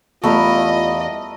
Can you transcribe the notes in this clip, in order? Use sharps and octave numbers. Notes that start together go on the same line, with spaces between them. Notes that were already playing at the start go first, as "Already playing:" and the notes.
E2 G3 A3 F4 A#4 D#5 B5